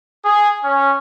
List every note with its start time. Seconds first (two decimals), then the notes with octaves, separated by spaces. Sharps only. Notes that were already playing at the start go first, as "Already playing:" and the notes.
0.24 G#4
0.64 C#4